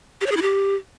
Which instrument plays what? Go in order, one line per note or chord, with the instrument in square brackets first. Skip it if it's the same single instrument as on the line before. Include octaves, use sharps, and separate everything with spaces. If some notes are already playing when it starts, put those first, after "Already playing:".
[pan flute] G4
C#5
G#4
E4
G4